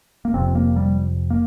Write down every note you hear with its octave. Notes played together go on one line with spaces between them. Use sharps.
A#3
F1 F2 C3 C4
A#3
G3
A#3